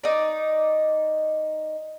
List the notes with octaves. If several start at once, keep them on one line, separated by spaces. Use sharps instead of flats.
D#4 D5